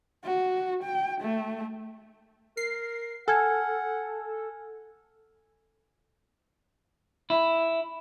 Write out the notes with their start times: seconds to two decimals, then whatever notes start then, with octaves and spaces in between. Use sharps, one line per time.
0.24 F#4
0.84 G5
1.21 A3
2.57 A#4 C7
3.28 A4 F#5 G#5 F6 G#6
7.30 E4